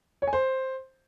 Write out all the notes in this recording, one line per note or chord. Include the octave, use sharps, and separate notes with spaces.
C#5
G#5
C5